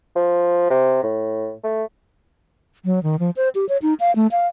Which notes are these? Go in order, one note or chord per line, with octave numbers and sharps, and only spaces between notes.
F3
C3
A2
A3
F#3
D#3
F3
C5
G4
C#5
D#4
F5
A3
F5